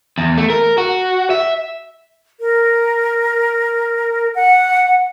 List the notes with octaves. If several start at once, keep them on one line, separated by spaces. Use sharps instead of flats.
E2
A3
A#4
F#4
E5
A#4
F#5